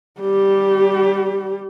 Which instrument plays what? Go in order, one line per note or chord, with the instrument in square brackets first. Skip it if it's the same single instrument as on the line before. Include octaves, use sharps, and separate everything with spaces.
[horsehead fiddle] G3 G4